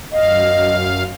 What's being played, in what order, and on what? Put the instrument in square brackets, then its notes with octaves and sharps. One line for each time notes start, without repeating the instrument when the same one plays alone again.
[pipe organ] F#2 F5 [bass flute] D#5